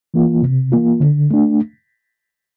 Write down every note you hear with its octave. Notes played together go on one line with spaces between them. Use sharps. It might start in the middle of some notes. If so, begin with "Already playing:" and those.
E3 A#3 F4
C3
E3 A#3 F4
D3
A3 D4